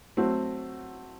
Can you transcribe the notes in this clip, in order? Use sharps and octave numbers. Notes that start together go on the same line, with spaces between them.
F#3 A3 C4 F#4